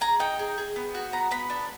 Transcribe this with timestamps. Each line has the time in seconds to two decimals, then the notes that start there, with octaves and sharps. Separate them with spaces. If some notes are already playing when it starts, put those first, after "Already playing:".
0.01 G#4 A#5
0.19 D#4 G5
0.39 G#4
0.58 G#4
0.76 B3
0.95 F#4
1.12 B3 A#5
1.31 B3 B5
1.50 D4